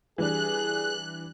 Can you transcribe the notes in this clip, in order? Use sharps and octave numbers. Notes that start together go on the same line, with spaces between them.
E3 G3 D4 G#4 F#6